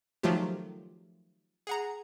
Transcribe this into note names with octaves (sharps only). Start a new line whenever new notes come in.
D#3 F3 F#3 A3 F4 G4
G#4 F#5 A#5